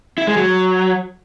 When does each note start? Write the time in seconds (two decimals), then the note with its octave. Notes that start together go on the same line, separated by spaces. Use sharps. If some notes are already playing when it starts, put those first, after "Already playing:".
0.18 E4
0.27 G#3
0.37 F#3